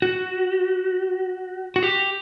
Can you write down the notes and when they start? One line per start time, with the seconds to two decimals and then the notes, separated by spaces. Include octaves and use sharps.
0.02 F#4
1.76 F#4
1.83 G4